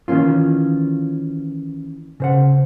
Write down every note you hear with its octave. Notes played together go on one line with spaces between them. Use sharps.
D#3 E3 A#3 C#4 F4
C#3 C5 F#5